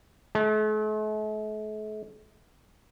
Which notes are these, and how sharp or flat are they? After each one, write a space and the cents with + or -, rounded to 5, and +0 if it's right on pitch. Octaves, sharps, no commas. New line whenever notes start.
A3 -45